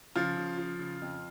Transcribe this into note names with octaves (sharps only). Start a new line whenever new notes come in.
C#3 F3 F4
C#3
F3
C#3
F2